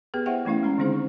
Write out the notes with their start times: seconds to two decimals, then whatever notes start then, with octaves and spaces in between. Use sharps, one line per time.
0.14 B3 G4 G#4 B4
0.26 E4 G#4 C5 E5 F#5 G5
0.45 E3 A3 C#4 E4 F5
0.63 G#3 C#4 A#5
0.78 D3 D#3 G#3 C4 D#4 G#4
0.93 C#6